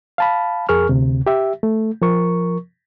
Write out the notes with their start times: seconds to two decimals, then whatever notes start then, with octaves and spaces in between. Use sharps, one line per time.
0.18 F5 A5 B5
0.69 F2 G#4 A#4 C#6 F6
0.89 D2 C3
1.27 G4 E5
1.63 A3
2.02 F3 A#4 C#6